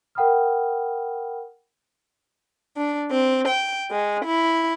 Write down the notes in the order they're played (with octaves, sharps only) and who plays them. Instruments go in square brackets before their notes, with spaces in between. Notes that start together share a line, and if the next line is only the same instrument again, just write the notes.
[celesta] A#4 F#5 G5 B5 D#6 F6
[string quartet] D4
C4
G5
G#3
E4